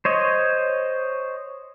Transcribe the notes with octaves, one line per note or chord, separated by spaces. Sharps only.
C5 C#5 D#5